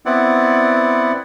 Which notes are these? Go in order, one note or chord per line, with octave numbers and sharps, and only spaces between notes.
B3 C4 E4 D5 F#5